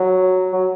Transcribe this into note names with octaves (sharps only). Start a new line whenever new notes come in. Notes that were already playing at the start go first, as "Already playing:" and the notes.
Already playing: F#3
F#3